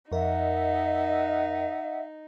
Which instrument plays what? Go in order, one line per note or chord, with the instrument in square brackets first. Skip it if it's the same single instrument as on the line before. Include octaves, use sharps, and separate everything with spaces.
[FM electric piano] F2 A#4 [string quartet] D#4 [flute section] D#5 E5 [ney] F#5